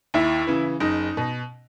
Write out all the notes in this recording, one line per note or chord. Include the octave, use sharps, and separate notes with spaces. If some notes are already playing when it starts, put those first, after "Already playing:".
D#2 E4
C#3 E3
F#1 D#4
B2